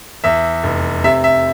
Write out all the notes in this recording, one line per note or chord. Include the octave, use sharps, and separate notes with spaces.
E2 E5
F1
C3 E5
E5